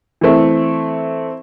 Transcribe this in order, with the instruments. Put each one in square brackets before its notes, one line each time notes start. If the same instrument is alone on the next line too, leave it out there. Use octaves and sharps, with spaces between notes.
[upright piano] E3 A3 C4 E4